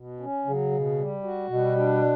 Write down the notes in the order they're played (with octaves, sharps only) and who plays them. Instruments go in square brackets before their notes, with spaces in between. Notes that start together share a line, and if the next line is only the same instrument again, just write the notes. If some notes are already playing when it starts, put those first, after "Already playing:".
Already playing: [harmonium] B2
C#4
[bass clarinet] C#3 [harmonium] F#3
[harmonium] B2
G3
F#4
[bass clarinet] B2 [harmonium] G3
[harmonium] D4